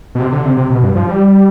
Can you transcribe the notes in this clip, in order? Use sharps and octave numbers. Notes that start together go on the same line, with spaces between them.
B2
C3
D3
C3
C3
B2
G2
F3
G3